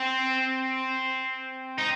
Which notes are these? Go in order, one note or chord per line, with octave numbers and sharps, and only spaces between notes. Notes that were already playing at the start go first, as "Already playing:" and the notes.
Already playing: C4
D#4